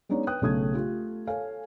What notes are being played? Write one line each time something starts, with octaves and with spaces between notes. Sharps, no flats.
G#3 B3 C#4 D#4 C#5 D5
B4 G5 D#6 F#6
B1 C#3 A3 D#6 G#6
A3 F4 G4
A4 C#5 F5 G#5